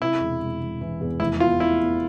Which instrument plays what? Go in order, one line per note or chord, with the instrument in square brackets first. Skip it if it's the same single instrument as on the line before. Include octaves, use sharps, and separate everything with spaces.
[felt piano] C3 [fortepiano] E4
[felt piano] E1
E1
E1
E3
E2
[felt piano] F1 [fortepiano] E4
[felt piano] B3 [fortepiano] F4
[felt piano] F1 [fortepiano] E4
[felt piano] B3